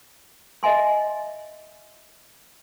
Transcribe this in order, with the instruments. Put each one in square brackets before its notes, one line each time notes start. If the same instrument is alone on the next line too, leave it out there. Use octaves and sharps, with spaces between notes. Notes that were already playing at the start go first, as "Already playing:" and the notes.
[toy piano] D#5 E5 G#5 C6